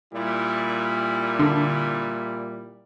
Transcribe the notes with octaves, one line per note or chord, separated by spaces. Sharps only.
A#2 G3 E4
D3